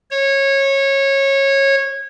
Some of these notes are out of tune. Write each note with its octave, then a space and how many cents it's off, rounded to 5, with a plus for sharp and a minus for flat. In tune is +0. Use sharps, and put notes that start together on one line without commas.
C#5 -20